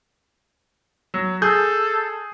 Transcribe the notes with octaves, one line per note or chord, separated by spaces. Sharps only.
F#3
G#4 A4 G6